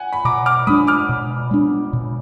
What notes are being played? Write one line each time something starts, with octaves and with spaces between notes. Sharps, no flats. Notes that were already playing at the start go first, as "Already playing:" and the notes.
Already playing: F#5 G#5
B5
B2 A#5 D6
D6 F6
G#3 B3 D4 B5 D#6
D6 F6
B2
G#3 B3 D4
B2